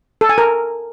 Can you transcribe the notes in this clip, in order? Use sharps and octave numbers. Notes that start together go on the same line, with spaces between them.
A4
G#5
A#4